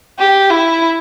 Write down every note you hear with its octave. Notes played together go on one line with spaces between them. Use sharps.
G4
E4